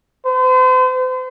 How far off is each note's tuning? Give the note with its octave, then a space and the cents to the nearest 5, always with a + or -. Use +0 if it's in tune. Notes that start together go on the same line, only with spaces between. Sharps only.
C5 -40